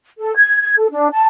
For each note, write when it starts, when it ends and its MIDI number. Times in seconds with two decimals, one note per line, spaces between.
0.19 0.36 69
0.36 0.60 92
0.61 0.73 92
0.78 0.87 69
0.90 1.08 62
1.12 1.26 81